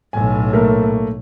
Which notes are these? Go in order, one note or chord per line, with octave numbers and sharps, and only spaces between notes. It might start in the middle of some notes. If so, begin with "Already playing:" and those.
B1 A2 G#5
A3 A#3 A#4